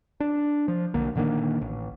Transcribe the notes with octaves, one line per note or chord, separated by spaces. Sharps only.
D4
F3
B1 D3 A#3
A#2 D3 D#3 A#3
A1